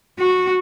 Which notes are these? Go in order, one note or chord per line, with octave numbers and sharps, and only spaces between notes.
F#4